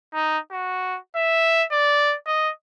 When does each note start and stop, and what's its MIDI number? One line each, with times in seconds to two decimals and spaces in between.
0.14 0.38 63
0.51 0.98 66
1.16 1.64 76
1.72 2.15 74
2.27 2.51 75